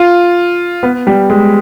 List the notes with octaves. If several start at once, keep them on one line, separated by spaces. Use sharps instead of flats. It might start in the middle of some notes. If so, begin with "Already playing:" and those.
Already playing: F4
B3
G3
G#3